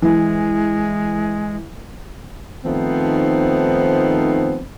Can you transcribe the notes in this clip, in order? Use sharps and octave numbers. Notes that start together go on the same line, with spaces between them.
E3 G#3
D#3 F3 A3 B3 C4 D#4